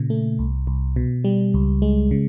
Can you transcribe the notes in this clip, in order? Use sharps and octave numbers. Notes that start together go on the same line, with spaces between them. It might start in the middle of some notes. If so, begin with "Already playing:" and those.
Already playing: A#2 C#3
A3
C2
C2
B2
G3
C#2
G#3
C#3